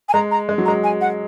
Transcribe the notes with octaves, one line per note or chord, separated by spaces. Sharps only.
G#5
G#3 A#5
A#5
G#3
F#3
G#3 A#5
G#5
F#5